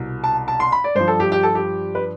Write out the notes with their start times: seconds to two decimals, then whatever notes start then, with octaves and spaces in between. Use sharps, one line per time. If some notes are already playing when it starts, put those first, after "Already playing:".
Already playing: C2 B2
0.24 A5
0.48 A5
0.60 C6
0.72 B5
0.84 D5
0.95 G2 F3 C5
1.08 A4
1.20 G4
1.32 G4
1.43 A4
1.55 G4
1.95 B4